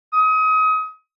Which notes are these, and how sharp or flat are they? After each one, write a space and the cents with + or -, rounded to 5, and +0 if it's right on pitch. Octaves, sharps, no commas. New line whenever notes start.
D#6 +30